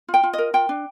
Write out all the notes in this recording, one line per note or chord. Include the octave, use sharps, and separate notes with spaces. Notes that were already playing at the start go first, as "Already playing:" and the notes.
F4
G5
F4
A#4 D#5
F4 G5
D4